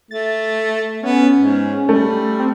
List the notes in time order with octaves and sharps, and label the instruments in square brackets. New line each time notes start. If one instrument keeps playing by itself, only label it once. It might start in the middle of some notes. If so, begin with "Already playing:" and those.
[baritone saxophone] A3 [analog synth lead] A6
[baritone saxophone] B3 [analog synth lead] C#4
[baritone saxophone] G#2
[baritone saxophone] G3 [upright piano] A3
[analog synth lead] C4